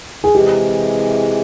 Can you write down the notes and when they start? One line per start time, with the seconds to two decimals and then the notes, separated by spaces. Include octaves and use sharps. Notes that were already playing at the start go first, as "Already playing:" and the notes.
0.24 G#4
0.34 C3 E3 G#3 G4